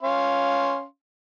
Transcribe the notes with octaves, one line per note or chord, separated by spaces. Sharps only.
C#4 F5 C6